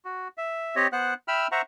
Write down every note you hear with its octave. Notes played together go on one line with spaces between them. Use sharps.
F#4
E5
C4 G4 C#5 D#5
B3 C5 F#5 F#6
E5 G5 B5 E6 F6
C5 E5 F#5 A#5 C#6